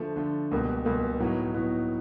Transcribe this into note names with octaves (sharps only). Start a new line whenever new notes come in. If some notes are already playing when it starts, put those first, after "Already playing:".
Already playing: D3 F3 A3
D3 F3 A3
C#2 B2 G3 A#3
C#2 B2 G3 A#3
A2 F#3 B3 D#4
A2 F#3 B3 D#4